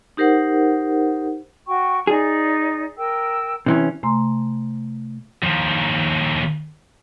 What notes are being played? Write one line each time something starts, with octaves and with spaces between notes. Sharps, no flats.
D#4 G4 A#4 C5 F#5
F#4 G5 C#6
D#4 G#4 D5
A#4 G5 E6
C3 E3 C#4
C3 A3 G#5 A#5 C6
D#2 F3